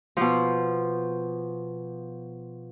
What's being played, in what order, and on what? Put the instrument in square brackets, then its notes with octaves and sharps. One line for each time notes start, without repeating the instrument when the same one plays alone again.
[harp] B2 F3